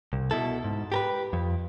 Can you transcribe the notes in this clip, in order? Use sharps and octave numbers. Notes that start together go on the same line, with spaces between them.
C2
B2 E4 A4
G#2
G4 A#4 B4
F2